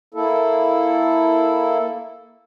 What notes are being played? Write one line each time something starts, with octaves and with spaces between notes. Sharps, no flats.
A#3 E4 A4